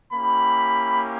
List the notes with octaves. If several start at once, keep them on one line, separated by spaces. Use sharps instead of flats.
A#3 C#4 E4 G4 B5